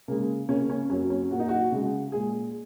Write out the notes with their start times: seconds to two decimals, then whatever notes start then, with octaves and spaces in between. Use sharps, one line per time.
0.08 C#3 G#3 A#3
0.49 C#3 A#3 C#4
0.69 C#4
0.90 F#2 F#3 A#3 C#4
1.10 C#4
1.31 A#2 F#3 A#3 F#4
1.40 D#4
1.48 F#4
1.72 C#3 G#3
2.12 A#2 G#3 G#4